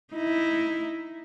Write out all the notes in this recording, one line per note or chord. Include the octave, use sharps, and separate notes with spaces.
D#4 E4